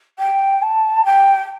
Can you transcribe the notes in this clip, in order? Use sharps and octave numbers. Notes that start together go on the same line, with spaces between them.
G5
A5
G5